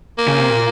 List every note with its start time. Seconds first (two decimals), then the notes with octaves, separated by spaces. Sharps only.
0.18 A#3
0.28 C#3
0.39 C3
0.49 A#2